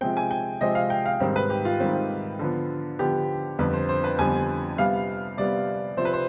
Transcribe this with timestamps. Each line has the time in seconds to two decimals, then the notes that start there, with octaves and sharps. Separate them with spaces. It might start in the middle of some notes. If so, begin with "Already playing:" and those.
0.01 C3 F3 G#3 C4 G5
0.17 G#5
0.31 G5
0.61 C3 F3 G#3 C4 D#5
0.75 F5
0.90 G5
1.06 F5
1.20 G#2 D#3 G3 C4
1.36 B4
1.50 G4
1.65 F4
1.80 G#2 D#3 G3 C4
2.39 D3 F3 B3
2.99 D3 F3 B3 G4
3.59 F2 D3 G3 B3 B4
3.73 C5
3.89 C5
4.04 B4
4.19 F2 D3 G3 B3 G#5
4.78 C3 G3 B3 F5
5.37 C3 G3 B3 D5
5.97 C3 F3 C4 C5
6.05 B4
6.13 C5